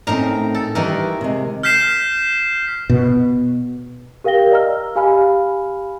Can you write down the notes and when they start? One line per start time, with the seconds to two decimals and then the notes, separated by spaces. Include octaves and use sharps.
0.07 A2 C4 C#4 D#4 A#4 A#5
0.55 A4
0.75 D#3 E3 G3 D#4 A#4
1.21 C3 G#3
1.63 F6 G6 B6 C7 E7
2.89 B2
4.24 G4 A#4 F5 G5 A#6 G7
4.52 D5 D#5 A#5 E6 F6
4.96 G4 F5 G#5 B5 F6